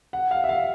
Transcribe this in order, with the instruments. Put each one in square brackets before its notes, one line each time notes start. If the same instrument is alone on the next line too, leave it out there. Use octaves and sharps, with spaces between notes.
[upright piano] F#5
F5
E5
F5